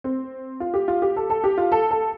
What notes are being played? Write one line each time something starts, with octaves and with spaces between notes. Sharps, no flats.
C4
F4
G4
F4
G4
A4
A4
G4
F4
A4
A4